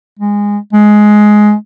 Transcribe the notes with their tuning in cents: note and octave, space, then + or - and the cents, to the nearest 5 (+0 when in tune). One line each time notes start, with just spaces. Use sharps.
G#3 -20
G#3 +15